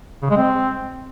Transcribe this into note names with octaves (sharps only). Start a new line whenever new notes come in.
C#3
G#3
C4